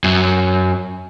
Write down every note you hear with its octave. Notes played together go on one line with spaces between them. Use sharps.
F#2